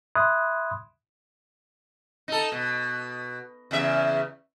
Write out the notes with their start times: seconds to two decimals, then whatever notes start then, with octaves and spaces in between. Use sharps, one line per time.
0.16 E5 B5 C6 D#6 F#6 G#6
2.28 D#4 A4
2.52 B2
3.71 E2 C#3 E5